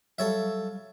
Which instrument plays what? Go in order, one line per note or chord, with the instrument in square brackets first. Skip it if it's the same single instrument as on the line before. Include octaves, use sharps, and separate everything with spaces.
[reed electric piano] F#3 G3 F5 [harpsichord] A4 C#5 E5